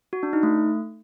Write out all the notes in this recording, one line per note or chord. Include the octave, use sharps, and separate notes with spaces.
F#4
D4
D#4
A3